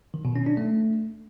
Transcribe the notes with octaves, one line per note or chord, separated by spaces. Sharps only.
D#3
B2
C#4
D4
A3